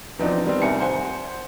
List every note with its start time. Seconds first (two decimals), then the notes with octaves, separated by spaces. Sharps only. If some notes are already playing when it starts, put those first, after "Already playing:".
0.19 E2 F3 B3 C4 D4 D#4
0.45 D#3 G3 B3 C4
0.62 C2 G#5 C#7
0.80 C5 F#5 G#5